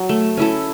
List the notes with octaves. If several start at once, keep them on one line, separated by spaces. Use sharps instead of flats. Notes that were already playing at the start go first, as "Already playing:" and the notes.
Already playing: F#3
A3
C#4 E4 A4